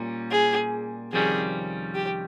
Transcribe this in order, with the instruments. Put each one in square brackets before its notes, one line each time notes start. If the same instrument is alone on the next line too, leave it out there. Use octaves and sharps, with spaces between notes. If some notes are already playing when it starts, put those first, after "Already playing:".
Already playing: [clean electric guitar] A#2 G3 C#4
[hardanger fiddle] G#4
[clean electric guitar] F2 C3 D#3 G3 C#4 [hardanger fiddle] G#4
[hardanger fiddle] G4